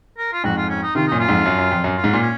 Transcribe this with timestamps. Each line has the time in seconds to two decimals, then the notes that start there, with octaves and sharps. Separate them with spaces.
0.18 A#4
0.33 F4
0.44 F2 G#2 F#4
0.57 F4
0.69 C#4
0.82 D#4
0.95 C3 D#3 F4
1.07 F#2 A#2 D#4
1.19 F4
1.28 F2 G#2
1.45 F#2
1.58 F#2
1.71 F2
1.84 F#2
1.97 F4
2.04 G#2
2.13 A#2
2.22 C#4